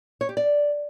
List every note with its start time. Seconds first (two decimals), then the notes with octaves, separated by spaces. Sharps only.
0.21 C#5
0.29 G4
0.37 D5